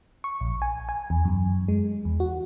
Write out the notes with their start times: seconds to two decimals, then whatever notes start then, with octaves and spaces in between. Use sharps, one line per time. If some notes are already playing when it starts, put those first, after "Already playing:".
0.24 C#6
0.41 A#1
0.62 G#5
0.89 G#5
1.10 E2
1.25 F#2
1.68 G#3
2.05 E2
2.20 F#4